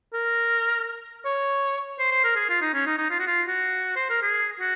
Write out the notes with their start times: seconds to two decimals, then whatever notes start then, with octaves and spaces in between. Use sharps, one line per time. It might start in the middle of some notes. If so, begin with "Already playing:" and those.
0.13 A#4
1.25 C#5
1.99 C5
2.11 C5
2.24 A#4
2.36 G#4
2.49 F4
2.61 D#4
2.74 C#4
2.87 D#4
2.98 D#4
3.11 F4
3.19 F#4
3.27 F4
3.48 F#4
3.96 C5
4.10 A#4
4.22 G#4
4.60 F#4